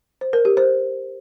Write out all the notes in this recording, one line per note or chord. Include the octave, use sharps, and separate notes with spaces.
C5
A#4
G4
C5